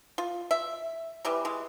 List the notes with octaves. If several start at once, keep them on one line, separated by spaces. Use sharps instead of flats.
F4
E5
C3 E3 G3
E3 G#3